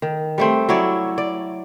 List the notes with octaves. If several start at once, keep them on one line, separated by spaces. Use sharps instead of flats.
D#3
G3 A3 C4
F#3 E4 C#5 D5
D5